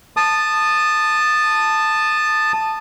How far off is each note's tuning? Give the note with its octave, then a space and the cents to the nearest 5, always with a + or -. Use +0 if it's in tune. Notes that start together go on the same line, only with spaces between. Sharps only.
A5 +0 D#6 -20